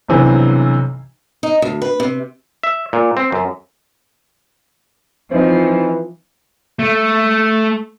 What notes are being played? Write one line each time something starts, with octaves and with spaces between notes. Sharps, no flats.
B1 G2 C3 E3 F#3
D#4
D2
B4
C3
E5
A#2
C4
F#2
E3 F3 C4 D#4
A3